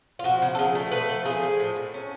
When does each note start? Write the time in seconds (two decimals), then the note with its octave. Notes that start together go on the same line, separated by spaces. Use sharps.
0.19 F4
0.24 F3 F#4
0.42 C#3
0.55 A4
0.59 F3 G#4
0.75 A3
0.92 A3 B4
1.09 F3
1.25 F3 G#4
1.43 F3
1.59 A2
1.76 A2
1.94 C#4